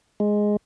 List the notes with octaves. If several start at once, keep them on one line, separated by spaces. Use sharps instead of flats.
G#3